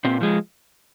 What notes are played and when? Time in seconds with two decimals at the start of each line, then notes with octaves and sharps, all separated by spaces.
0.04 A#2 C4
0.21 F3 G#3